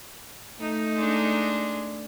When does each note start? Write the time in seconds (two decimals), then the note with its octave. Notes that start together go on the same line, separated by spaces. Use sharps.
0.59 A3 D#4
0.94 G#3 D4